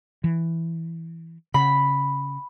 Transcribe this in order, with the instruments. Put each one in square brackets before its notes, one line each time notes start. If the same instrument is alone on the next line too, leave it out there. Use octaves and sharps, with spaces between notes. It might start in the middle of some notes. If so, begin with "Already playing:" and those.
[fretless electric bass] E3
[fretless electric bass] C#3 [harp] B5